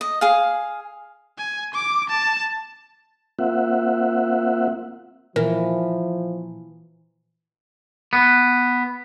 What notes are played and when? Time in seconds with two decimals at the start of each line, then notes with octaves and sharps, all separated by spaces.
0.01 D#5
0.21 G#4 F5
1.38 G#5
1.74 D6
2.09 A5
3.39 A#3 C4 F4 E5 F#5
5.36 A#2 E3 F3 A#4
8.13 B3